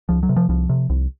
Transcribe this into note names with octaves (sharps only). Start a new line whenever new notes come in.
C#2 F3
F#3
C3
F3
C2 F3
C3
C2